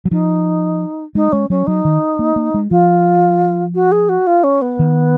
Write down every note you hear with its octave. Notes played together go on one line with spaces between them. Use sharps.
F#3
F3 D#4
G#3 D#4
G#3 C#4
F#3 C#4
F#3 D#4
D#3
A#3
A#3
G#3
F3 F4
F#4
G#4
F#4
F4
C#4
B3
D#3